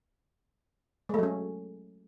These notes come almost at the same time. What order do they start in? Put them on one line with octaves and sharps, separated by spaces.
G#3 A3 F#3 C#4